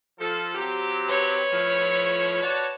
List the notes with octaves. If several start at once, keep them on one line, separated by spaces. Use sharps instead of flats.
F3 A4
F#3 C4 G4
B4 C#5
A2 F3
F#4 D5 A5